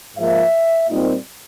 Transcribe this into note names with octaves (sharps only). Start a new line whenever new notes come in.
G#2 F3 A#3 E5
A#2 G3 C4 D#4